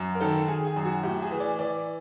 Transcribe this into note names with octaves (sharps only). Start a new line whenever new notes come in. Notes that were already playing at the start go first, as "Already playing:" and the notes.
Already playing: F#2
A#4
D#3 A4
D#3 G#4
G#4
F#2
F#4
A2 G4
G#4
E3
D5
E3 D5